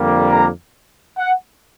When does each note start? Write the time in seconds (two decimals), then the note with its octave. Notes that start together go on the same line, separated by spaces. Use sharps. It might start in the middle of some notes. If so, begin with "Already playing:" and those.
Already playing: F2 D3 G3 A#3
0.32 A#5
1.19 F#5